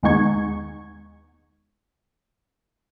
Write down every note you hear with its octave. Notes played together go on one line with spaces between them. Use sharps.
D#2 G#3 B3 D#4 C#6 G#6